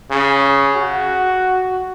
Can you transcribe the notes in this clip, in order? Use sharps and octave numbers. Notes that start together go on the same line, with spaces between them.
C#3
F#4